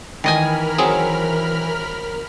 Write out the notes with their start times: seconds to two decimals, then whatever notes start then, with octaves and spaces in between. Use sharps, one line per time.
0.24 D#3 E3 A#4 D#5 G#5 B5 F6
0.78 F#3 C4 G#4